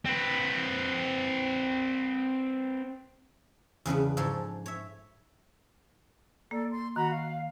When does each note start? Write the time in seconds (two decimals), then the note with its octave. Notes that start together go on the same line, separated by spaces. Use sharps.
0.05 C4 B4
3.86 E2 C#3 B3 D4
4.17 G#2 F3 D4 A4 C#5 C6
4.66 C#5 E5
6.51 A#3 A4 D5
6.71 C6
6.96 D#3 F#4 A#5 B5
7.10 F5